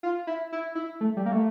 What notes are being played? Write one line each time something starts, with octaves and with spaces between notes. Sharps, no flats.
F4
E4
E4
E4
A3
G3
A#3
A3